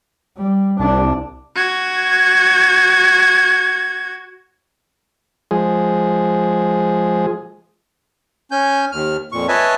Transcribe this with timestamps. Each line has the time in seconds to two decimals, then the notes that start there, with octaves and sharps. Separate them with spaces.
0.38 G3
0.80 C2 D4
1.55 F#4 G#6
5.51 F3 G#3 G#4
8.51 C#4 G#5 G6
8.92 D#2 F6
9.32 F2 A#2 C#6
9.48 B4 C#5 D#5 E5 G#5 A5